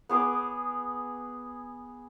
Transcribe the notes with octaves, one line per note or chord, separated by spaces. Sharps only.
B3 G#4 D6